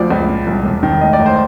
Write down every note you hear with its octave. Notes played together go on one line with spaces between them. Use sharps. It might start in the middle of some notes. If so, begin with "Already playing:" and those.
Already playing: D2 F3 D5
C#2
A#2
C2
E1
D#3
A2 D#5
D5
A1
C5